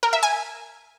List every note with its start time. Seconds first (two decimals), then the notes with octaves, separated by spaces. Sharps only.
0.03 A#4
0.13 E5
0.23 G#5